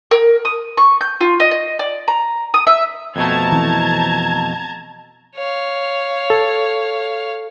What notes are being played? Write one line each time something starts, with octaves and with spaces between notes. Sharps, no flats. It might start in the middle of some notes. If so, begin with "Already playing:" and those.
A#4
D#6
C#6
G6
F4
D#5
D#5
D5
A#5
D#6
E5
F2 B2 A3 A5 A#5 G#6
E3 C4
C#5 F5
A4